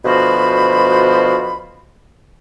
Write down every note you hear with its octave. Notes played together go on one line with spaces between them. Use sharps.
D2 B2 F3 F#4 C5 B5